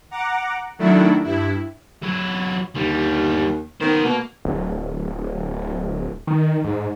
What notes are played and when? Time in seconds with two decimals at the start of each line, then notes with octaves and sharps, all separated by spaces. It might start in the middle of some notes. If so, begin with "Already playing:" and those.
0.11 F#5 A#5 D6
0.78 D#3 F#3 A3 D4 E4
1.24 G2 E4
2.03 F#3 E4
2.75 D#2 D3 G3
3.81 D#3 B3 C5
4.05 B2 A#3
4.45 D1
6.27 D#3
6.64 G#2